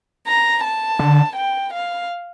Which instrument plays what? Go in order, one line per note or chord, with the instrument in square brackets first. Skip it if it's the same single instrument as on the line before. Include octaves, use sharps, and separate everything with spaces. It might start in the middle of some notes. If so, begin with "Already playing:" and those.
[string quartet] A#5
A5
[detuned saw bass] D3
[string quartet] G5
F5